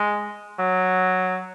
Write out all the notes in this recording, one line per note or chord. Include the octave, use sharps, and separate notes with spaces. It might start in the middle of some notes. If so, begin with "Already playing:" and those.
Already playing: G#3
F#3